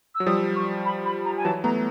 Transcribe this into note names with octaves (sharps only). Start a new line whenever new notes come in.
E6
F#3
F3 G3 D#6
C#6
B5
B5
A#5
G#5
E3 F#3 A5
A3 B3 A#5